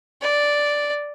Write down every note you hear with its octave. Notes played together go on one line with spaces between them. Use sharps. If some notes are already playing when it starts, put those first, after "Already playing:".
D5